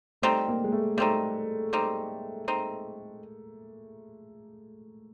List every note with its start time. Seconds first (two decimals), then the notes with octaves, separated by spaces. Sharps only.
0.22 G3 A3 C4 D#4
0.48 A#3
0.64 G#3
0.72 A3
0.97 G3 A3 C4 D#4
1.73 G3 C4 D#4
2.48 C4 D#4